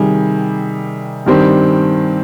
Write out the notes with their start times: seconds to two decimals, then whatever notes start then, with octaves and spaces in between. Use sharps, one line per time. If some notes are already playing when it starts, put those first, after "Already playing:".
Already playing: C3 D#3 G3 G#4
1.26 G2 D#3 G3 C4